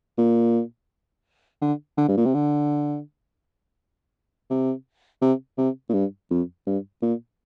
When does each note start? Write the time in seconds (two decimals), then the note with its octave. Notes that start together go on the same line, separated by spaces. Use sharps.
0.18 A#2
1.61 D3
1.97 D3
2.08 G2
2.17 A#2
2.25 C3
2.34 D3
4.50 C3
5.22 C3
5.58 C3
5.89 A#2
5.94 G2
6.31 F2
6.67 G2
7.02 A#2